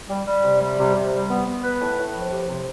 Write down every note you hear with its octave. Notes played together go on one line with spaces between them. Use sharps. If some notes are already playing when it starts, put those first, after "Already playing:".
G3
G3
C3
G3
C3
C3
G3
B3
B3
B4
A2
A2
F3
G4
C3